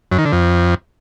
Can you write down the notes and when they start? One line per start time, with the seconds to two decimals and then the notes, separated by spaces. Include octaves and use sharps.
0.11 F#2
0.18 D#3
0.25 D3
0.32 F2